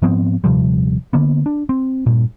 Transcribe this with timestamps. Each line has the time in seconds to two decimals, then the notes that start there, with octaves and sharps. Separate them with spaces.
0.02 G#2 F3 B3 C4
0.44 D#1 C3 F3 G3
1.13 D3 A#3 B3
1.46 D4
1.69 C4
2.06 G2 A#2